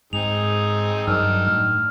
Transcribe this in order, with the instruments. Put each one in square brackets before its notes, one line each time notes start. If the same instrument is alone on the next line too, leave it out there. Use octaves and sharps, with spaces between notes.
[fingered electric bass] G#2 [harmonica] C4 D#4 G#4 [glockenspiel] F7
[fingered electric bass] G2 F#3 [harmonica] D#3 D4 [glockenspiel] E6 F6
[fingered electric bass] A2 [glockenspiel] F6